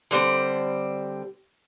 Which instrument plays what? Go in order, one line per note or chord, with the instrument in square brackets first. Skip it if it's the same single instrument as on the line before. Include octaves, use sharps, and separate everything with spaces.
[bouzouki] D3 G3 A3 C4